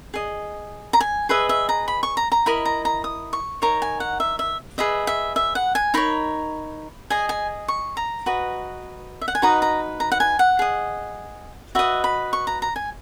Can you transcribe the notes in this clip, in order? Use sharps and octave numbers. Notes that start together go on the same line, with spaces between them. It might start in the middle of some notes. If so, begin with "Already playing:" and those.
G#4 D#5
A#5
G#5
G#4 B4 D#5 E5
E5
A#5
B5
C#6
A#5
A#5
E4 A#4 D#5 B5
A#5
A#5
D#6
C#6
D#4 A#4 C#5 A#5
G#5
F#5
E5
E5
G#4 B4 D#5 E5
E5
E5
F#5
G#5
D#4 A#4 C#5 B5
G#4 D#5 G#5
G#5
C#6
A#5
F#4 B4 D#5
E5
F#5
G#5
D#4 F#4 B4 D#5 A#5
A#5
A#5
F#5
G#5
F#5
G#4 D#5
F#4 B4 D#5 E5
B5
C#6
A#5
A#5
G#5